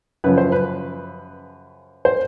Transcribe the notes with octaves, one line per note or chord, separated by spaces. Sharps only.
F#2 C#3 F3 B4
C5
B4
C5